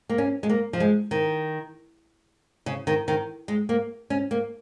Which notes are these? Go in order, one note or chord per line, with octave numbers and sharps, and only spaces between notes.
A#3
C#4
G#3
A#3
F3
G#3
D#3
C#3
D#3
D#3
G#3
A#3
C#4
A#3